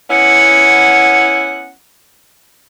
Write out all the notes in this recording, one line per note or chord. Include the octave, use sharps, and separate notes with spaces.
B3 C#4 E4 F#5